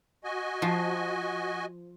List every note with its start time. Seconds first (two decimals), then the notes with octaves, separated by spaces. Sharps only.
0.24 F#4 D#5 G#5
0.62 F3